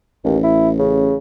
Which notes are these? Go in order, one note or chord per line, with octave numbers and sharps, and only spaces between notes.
A1 D#2
E4
C#3